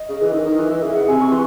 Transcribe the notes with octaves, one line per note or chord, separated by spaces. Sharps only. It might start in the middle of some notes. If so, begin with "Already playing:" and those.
Already playing: D#5
C#3
E3
D#3
D#3
E3
E3
C#3 E5
F#5
C3 G#5
C#6
E3 C6